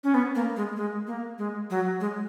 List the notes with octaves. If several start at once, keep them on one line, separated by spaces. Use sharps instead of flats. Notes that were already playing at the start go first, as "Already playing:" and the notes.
C#4
B3
A#3
G#3
G#3
A#3
G#3
F#3
G#3